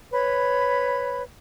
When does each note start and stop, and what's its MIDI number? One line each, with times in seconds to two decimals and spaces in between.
0.12 1.22 71
0.12 1.22 73
0.12 1.22 83